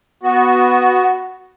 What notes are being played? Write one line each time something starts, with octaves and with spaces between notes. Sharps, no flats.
B3 F#4